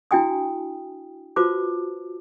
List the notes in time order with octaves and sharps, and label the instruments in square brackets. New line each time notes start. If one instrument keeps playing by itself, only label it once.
[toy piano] D4 E4 F#4 G5 G#5 D#6
F4 F#4 B4 C5 A5 D6